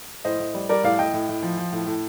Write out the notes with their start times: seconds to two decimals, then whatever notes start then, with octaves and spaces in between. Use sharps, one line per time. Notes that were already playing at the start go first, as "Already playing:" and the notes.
0.24 A2 C5 D#5
0.40 A2
0.54 G3
0.69 G3 A#4 D5
0.84 A2 D5 F5
0.99 A2 D#5 G5
1.13 A2
1.29 A2
1.42 F3
1.57 F3
1.72 A2
1.87 A2